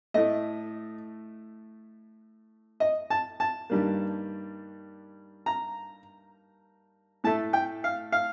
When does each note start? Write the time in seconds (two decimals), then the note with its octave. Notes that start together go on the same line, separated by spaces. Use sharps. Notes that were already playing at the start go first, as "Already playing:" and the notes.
0.14 A2 A3 D#5
2.80 D#5
3.10 A5
3.40 A5
3.70 G2 D#3 G3 A#3
5.46 A#5
7.24 A2 A3 A5
7.53 G5
7.84 F5
8.12 F5